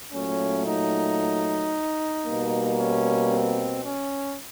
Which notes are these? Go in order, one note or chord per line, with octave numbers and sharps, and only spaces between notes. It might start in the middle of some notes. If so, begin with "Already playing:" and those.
A#2 F#3 A3 C#4
D#4
B2 G3 A#3
C#4
C4
C#4